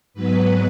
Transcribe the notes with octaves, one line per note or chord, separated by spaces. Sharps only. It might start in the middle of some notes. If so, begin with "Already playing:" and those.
G#2 F#3 B3 B4